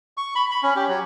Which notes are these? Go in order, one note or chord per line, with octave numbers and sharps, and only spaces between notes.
C#6
B5
B5
C#4
G4
F#3